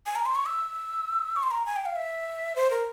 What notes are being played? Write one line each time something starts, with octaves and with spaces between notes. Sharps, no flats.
G#5
A#5
C6
C#6
E6
C#6
C6
A#5
G#5
G5
F5
E5
C5
A#4